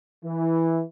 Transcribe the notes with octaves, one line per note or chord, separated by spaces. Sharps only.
E3